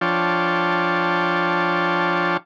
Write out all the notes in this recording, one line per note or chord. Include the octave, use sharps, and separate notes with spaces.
F3 D4 F4 C#5 G5 A5